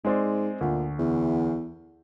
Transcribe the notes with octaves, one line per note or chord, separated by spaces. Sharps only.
G#2 G#3 C4 D5
D2 A#2
E2